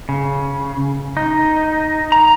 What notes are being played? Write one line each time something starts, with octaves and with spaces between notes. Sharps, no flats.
C#3
D#4
A#5